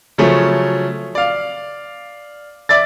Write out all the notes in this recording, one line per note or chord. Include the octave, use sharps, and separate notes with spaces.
C#3 F3 F#3 A3 C#4
D5 F5
D5 E5 A6